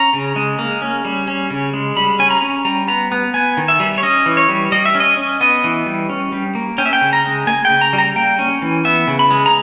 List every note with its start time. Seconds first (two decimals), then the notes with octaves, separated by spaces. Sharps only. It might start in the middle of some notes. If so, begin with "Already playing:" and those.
Already playing: C#4 A#5
0.13 C#3
0.36 G#3
0.59 A#3
0.82 C#4
1.05 G3
1.28 C#4
1.50 C#3
1.74 G#3
1.96 G3 B5
2.19 C#4 G#5
2.31 A#5
2.42 C#4
2.65 G3 A#5
2.88 B3 A#5
3.12 B3
3.34 B3 G#5
3.57 D#3
3.68 E5
3.80 G3
3.98 C#5
4.03 C#4 D#5
4.26 E3
4.37 C#5
4.49 G3
4.72 G3 D#5
4.85 E5
4.95 C#4
5.00 D#5
5.17 C#4
5.41 B3 D#5
5.64 E3
5.86 G3
6.10 C#4
6.32 G3
6.55 A#3
6.78 C#4 G5
6.86 E5
6.93 G5
7.01 C#3
7.13 A#5
7.24 G#3
7.47 A#3 G#5
7.65 G5
7.70 C#3
7.81 A#5
7.93 G3
7.98 A#5
8.16 A#3 G5
8.39 C#4
8.62 E3
8.85 B3 E5
9.07 C#3
9.19 B5
9.30 G#3
9.46 A#5